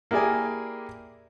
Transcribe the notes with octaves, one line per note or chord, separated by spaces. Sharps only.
A#3 E4 G4 G#4 D5 G#5